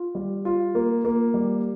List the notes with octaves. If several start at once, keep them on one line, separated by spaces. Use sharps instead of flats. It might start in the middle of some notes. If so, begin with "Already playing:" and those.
Already playing: F4
G3
F4
A#3
A#3
G3